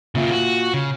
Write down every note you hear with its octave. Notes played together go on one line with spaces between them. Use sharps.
A#2 C#3 A#3 E5
F#4
C#3